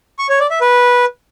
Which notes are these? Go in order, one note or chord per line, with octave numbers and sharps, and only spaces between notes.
C#6
C#5
D5
E5
B4